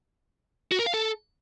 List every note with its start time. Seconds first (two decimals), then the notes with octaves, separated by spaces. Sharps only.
0.72 F#4
0.79 A#4
0.86 F5
0.94 A4